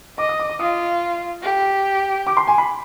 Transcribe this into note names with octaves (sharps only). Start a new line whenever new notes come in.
D#5 D6
D#6
D6
D6
F4 D#6
G4
D6
C6
G#5
B5